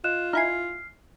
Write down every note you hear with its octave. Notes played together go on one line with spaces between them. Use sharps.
F4 D#5 F#6 E7
D#4 E4 G#5 F6 C7